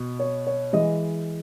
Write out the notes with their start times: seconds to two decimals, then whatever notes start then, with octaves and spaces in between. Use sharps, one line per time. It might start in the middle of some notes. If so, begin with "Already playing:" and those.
Already playing: B2
0.19 C#5
0.47 C#5
0.73 E3 G#3 D#5